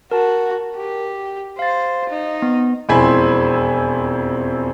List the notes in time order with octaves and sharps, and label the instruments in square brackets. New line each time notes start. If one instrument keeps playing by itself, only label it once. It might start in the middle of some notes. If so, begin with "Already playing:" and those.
[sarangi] F#4 [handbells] A#4 A5
[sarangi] G4
[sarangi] C5 [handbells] F5 A6
[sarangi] D#4
[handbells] B3
[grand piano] E1 F2 C4 E4 G#5 B5